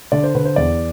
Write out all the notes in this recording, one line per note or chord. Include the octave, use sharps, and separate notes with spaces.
D3 D5
C5
D3 B4
C5
E2 D5